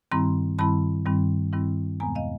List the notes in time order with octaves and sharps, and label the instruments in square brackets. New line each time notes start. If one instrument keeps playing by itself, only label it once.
[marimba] G2 D#3 G3 C4 E4 A#5 C6
G2 D#3 G3 C4 E4 A5 B5
G2 D#3 G3 C4 E4
G2 D#3 G3 C4 E4
E2 B2 G#3 B3 G#5 A#5
D#5 F5